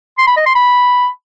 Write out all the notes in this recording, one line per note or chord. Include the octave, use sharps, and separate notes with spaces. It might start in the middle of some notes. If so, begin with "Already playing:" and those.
C6
B5
D#5
C6
B5